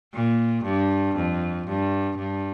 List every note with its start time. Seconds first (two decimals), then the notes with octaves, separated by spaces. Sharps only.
0.14 A#2
0.65 G2
1.16 F2
1.67 G2
2.18 G2